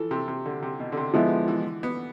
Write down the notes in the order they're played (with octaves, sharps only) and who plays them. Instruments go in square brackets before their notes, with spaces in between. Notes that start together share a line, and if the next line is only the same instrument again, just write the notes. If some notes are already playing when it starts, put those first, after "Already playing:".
Already playing: [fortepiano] E3 F3 [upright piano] A4
[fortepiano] C3
C3
D3
C3
B2
D3
C3
[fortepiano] D3 [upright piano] F3 G#3 B3 E4
[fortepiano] E3
B3